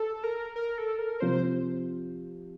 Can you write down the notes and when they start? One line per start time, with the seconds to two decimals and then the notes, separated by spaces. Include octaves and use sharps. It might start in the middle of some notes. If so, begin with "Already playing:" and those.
Already playing: A4
0.24 A#4
0.56 A#4
0.78 A4
0.99 A#4
1.20 C3 F3 C5